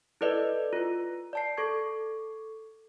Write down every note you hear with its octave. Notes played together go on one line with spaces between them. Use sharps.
E4 A4 B4 D5 D#5
F4 B4
D5 A5 C7
A4 C#6 G#6